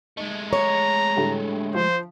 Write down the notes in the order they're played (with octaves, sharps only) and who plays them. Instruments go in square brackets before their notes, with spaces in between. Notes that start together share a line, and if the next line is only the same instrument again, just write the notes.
[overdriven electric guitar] G#3 A3 [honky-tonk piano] D#4
[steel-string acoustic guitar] C#5 [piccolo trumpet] A#5
[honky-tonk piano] A2 D3 G3
[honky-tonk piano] F3 [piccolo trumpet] C5